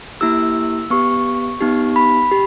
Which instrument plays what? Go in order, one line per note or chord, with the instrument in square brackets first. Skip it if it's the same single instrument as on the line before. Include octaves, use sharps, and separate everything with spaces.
[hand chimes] A#3 E4 G4 E6
B3 G4 C#6
B3 D#4 G4
B5
G4